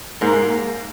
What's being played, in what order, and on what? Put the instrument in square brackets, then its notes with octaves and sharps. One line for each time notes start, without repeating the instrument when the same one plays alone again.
[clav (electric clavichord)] G#2 [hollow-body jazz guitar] A#3